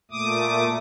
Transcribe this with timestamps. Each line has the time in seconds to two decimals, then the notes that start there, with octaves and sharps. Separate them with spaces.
0.11 A#2 A3 D6 D#6